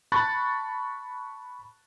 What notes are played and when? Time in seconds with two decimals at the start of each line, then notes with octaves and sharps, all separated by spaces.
0.12 A5 B5 C#6 F#6 A6